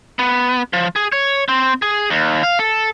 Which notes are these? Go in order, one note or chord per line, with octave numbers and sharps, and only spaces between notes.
B3
F3
G#4
C#5
C4
G#4
D#2
F5
A4